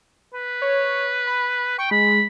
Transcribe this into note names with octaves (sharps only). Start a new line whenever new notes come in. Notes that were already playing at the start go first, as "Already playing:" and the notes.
B4
C#5
B5
G5 C#6
G#3 B5